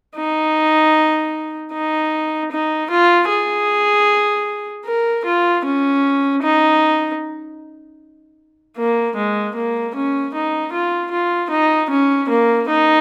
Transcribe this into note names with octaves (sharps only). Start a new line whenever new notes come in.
D#4
D#4
D#4
F4
G#4
A#4
F4
C#4
D#4
A#3
G#3
A#3
C#4
D#4
F4
F4
D#4
C#4
A#3
D#4